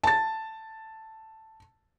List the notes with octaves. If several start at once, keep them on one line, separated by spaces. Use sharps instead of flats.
A5 A6